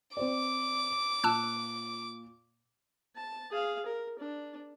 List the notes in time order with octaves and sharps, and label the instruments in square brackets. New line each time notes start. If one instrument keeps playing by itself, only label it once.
[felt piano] C4 C5 D5 [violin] D6
[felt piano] A#2 [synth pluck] A5 E6 F#6
[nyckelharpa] A5
G#4 F5
A#4
D4